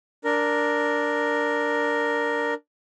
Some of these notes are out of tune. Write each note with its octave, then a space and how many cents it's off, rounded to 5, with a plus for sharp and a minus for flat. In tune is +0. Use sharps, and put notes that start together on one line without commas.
D4 +0 A#4 +0